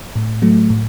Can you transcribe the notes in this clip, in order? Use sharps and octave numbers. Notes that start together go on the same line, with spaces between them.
A2
F#3 A3
A2